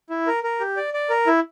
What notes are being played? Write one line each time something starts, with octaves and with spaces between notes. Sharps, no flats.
E4
A#4
A#4
G4
D5
D5
A#4
E4